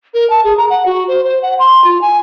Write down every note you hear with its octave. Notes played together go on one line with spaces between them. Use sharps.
A#4
A5
G#4
A#5
F#5
F#4
C5
C5
F#5
C6
F4
G#5